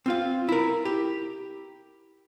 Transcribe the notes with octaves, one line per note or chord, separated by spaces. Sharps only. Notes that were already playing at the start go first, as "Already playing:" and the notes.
C4 F4 F5
E4 A#4
G4